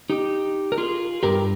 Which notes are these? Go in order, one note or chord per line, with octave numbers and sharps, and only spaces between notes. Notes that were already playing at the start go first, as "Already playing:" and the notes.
D#4 G4
A#4
F4 G#4
G2 G3 G4 A#4